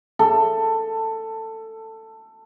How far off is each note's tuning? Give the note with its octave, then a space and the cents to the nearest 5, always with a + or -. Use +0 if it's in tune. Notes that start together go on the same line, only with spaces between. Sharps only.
A4 +15